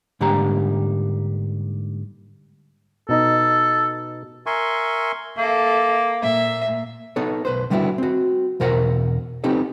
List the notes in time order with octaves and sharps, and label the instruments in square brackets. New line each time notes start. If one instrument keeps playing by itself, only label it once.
[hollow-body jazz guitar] G#2 D3 G3 A#3 G4 A#5
[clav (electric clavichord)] B2 D#4 D#5 [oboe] A4
[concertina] A#4 E5 G#5 C6 C#6
[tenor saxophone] A#3 [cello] A4 E5
[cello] A#2 [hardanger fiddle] E5
[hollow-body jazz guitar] B3 D#4 A4 C#5
B1 B4 C5
D3 G3 B3 D#4 E4 F#4
C4 F#4
E2 B2 A#4 C5 F#5 A#5
B3 C4 D#4 G4 A4